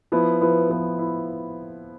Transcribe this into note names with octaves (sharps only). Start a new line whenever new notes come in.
F3 B3 E4
F3 B3 E4
F3 B3 E4
E4